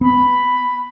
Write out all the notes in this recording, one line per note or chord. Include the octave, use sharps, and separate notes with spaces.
B3 B5